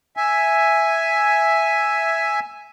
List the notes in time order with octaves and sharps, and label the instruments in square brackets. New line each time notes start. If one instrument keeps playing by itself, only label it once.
[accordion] E5 G#5